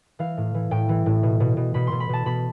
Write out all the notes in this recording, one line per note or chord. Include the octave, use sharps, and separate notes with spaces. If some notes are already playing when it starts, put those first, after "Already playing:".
E3 F5
A2
E3
A2 G5
E3
A2
B2
B2
B2
B2 B5
B2 C6
B5
B2 A5
B2 B5